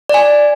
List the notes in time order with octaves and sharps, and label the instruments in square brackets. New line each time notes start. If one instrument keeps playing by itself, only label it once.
[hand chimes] D5 G#5